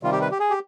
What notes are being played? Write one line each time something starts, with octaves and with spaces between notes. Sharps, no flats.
C3 D#3 G3 F4
G4
B4
G4
G#4
G4